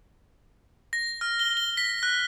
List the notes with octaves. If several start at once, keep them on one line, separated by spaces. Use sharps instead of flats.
A#6
F6
G7
G7
B6
F#6